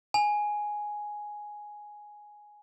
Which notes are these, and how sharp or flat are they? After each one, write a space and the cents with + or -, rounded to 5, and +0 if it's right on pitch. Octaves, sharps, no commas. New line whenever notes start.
G#5 +5